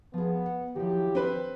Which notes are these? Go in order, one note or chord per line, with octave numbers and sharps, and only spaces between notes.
F3 B3 G#4
F#5
D#3 F3 F#3 E4 G4
C4 B4